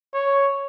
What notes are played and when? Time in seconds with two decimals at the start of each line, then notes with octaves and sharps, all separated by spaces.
0.14 C#5